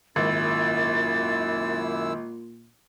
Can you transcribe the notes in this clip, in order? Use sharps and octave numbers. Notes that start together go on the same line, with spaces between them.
G#1 F#2 A#2 E4 E6 A6